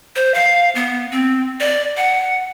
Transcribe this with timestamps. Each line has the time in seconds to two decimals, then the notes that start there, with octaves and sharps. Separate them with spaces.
0.16 C5
0.34 F5
0.75 B3
1.12 C4
1.60 D5
1.97 F#5